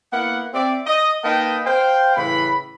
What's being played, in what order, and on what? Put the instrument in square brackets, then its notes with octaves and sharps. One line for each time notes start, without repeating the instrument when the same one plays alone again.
[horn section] A#3 B3 E4 F#5
C4 D5 E5
D#5
A#3 D#4 B4 D#5 G5 A5
C5 F5 G5
A2 C#3 E3 B5